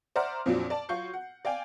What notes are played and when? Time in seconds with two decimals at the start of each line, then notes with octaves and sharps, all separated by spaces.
0.16 C5 D5 E5 F#5 A#5 F6
0.46 F2 A#2 F3 F#3 C4 D4
0.70 D5 A5
0.89 F#3 F4 F#4 C#6 G6 C7
1.14 F#5
1.45 D5 F5 G5 G#5